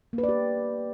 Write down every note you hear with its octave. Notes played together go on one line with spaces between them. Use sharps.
A#3
B4
D5
G4